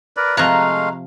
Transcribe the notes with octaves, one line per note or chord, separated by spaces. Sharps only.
A#4 B4 D5
C3 F3 G#3 A3 F5 A#5 F#6